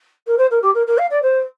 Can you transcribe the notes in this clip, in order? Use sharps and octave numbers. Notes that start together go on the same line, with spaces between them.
A#4
C5
A#4
G4
A#4
A#4
F5
D5
C5